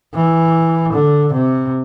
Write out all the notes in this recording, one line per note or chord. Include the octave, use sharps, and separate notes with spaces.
E3
D3
C3